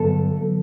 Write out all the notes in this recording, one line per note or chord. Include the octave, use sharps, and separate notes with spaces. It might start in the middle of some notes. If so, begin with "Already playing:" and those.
Already playing: G2 D3 F#3 B3 A4
D3 F#3 B3